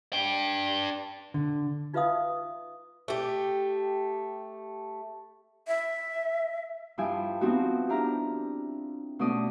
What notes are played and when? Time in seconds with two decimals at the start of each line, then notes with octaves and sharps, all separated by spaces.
0.13 D4 G5
1.34 D3
1.93 D#4 F4 B4 E5 F5 D#6
3.08 A3 G4
5.67 E5
6.98 G2 F3 E4 G5 G#5
7.41 F3 B3 C4 D#4 F#4 G4
7.89 D4 E4 G4 A#5 F6
9.19 B2 A3 C#4 D5 D#6